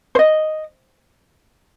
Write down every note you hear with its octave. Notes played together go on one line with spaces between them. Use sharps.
C5
D#5